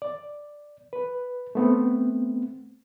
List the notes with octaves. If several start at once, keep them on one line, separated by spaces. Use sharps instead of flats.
D5
B4
A3 B3 C4